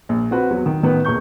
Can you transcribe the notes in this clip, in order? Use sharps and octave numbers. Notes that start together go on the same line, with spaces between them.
A#1
C4 F#4 B4
E2 F#3
D#3
A1 D#3 B3 B4
E1 A#2 C#6 G6